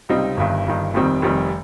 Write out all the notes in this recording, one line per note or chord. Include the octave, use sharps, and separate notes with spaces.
C#2 C3 G3 C4 D#4
G1 G2 D#3
G1 G2 D#3
F1 F2 D#3 G3 C4
F1 F2 D#3 G3 C4